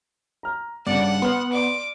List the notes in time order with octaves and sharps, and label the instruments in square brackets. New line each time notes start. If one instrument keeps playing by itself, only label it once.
[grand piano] A#5 F6
[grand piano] G2 C#3 [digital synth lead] D5 [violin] F#5
[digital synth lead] B3 [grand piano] C6 F6 C7
[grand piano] D5 C6 [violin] D6